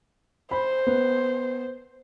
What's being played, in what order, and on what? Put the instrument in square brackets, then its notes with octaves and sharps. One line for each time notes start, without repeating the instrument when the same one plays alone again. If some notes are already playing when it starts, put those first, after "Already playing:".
[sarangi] C5 [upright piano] B5
[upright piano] B3